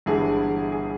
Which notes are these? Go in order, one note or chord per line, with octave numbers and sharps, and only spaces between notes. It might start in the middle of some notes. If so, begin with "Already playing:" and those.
G1 G2 E3 G#3 G#4
G#4